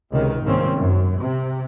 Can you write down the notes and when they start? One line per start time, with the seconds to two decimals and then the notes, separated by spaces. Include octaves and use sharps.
0.11 C#2 C3 D#3
0.43 C2 G#2 D#3 A#3 C4 C#4
0.76 F#2
1.20 C3